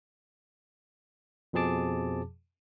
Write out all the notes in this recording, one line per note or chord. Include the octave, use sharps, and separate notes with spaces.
F2 B2 F3 G#4 A5 D6